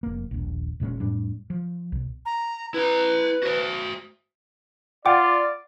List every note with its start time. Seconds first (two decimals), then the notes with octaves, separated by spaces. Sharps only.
0.03 F1 A#3
0.31 D#1 A#1
0.80 E1 A#2 G#3 C#4
1.00 F2 A2 G3 D4
1.50 F3
1.92 B1
2.26 A#5
2.74 E4 B4 A#5
3.43 F#4 C5
5.06 F4 D5 F#5 G5 D6